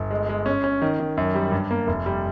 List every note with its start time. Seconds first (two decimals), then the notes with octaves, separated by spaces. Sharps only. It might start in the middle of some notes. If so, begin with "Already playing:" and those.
Already playing: G1
0.11 G#3
0.29 G#3
0.46 C#4
0.64 C#4
0.82 D#3
1.00 D#3
1.17 F#2
1.35 G3
1.52 G2
1.71 A#3
1.87 F1
2.06 G3